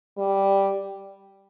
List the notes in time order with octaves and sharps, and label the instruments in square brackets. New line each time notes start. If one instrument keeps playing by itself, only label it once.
[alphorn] G3